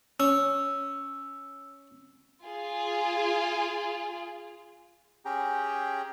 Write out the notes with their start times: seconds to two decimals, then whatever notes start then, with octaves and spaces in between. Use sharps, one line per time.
0.20 C#4 E6
2.45 F4 G#4
5.25 C#4 G4 G#4 G5 A#5